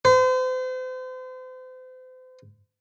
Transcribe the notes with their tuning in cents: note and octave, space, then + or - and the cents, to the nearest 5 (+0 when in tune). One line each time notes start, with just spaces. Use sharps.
C5 -40